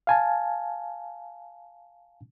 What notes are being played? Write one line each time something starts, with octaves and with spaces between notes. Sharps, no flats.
F5 G#5 A5